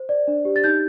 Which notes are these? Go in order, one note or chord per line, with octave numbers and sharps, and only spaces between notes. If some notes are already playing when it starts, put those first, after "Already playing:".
Already playing: C5
D5
D4
G4
A6
D#4 G6